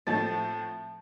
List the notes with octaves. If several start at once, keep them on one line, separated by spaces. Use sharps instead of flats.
A2 F3 A3 C4 A5